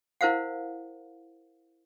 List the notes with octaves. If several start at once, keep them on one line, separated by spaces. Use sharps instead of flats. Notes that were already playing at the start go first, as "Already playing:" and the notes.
E4 A#4 C5 F5 F#5